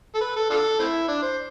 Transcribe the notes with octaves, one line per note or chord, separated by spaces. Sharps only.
A4
B4
A4
D4 F4 A4
A3 C4 E4
D4
C5